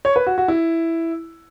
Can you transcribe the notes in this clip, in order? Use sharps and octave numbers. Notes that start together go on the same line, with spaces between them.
C#5
B4
F#4
F#4
E4